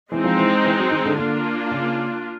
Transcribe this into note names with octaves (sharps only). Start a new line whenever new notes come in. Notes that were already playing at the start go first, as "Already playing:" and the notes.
E3 G#3 C4 D#4
F3
E3
E3
F#3
D#3
D3
D3 A#3 D4 F4
C#3